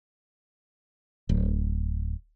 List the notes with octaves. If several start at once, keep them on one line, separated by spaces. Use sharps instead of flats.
D1